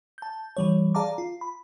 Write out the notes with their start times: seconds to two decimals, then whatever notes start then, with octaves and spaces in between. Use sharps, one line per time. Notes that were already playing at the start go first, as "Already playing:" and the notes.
0.18 A5 G6
0.57 E3 G3 C#5
0.95 G#4 D5 F5 A5 A#5 D6
1.18 F4
1.41 B5